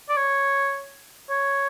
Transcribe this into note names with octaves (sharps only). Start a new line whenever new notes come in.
D5
C#5
C#5